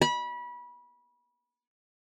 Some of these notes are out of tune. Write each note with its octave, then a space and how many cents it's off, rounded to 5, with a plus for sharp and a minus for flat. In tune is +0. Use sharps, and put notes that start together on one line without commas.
B5 -25